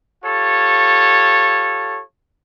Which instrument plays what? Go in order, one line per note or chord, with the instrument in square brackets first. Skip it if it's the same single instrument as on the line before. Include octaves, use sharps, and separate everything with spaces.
[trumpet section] F4 G4 A4 C#5